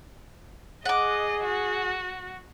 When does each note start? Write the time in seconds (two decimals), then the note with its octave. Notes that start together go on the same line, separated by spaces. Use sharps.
0.85 G#4 D#5 F#5 D6
1.44 F#4